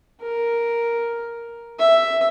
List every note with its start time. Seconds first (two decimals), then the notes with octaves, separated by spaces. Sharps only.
0.21 A#4
1.79 E5